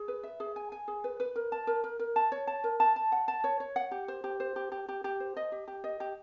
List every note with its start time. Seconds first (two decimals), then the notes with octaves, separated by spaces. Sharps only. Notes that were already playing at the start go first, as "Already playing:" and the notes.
Already playing: G#4
0.08 B4
0.23 E5
0.40 G#4
0.56 G#5
0.72 G#5
0.88 G#4
1.04 B4
1.20 B4
1.36 A#4
1.52 A5
1.67 A#4
1.84 A#4
2.00 A#4
2.16 A5
2.32 C#5
2.47 A5
2.64 A#4
2.80 A5
2.96 A5
3.12 F#5
3.28 A5
3.44 C#5
3.60 C#5
3.76 F#5
3.91 G4
4.08 C5
4.24 G4
4.40 C5
4.56 G4
4.72 G4
4.89 G4
5.04 G4
5.20 C5
5.37 D#5
5.52 G4
5.68 G4
5.84 D#5
6.00 G4